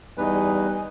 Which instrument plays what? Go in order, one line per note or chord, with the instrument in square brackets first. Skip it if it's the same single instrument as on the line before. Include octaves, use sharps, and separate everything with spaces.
[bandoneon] E2 B4 [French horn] G3 [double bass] D#4 [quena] G#5